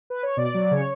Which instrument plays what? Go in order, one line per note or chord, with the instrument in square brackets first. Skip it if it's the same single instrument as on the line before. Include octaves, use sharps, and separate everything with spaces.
[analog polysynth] B4
C#5
B2 D5
F#3
C#3 C#5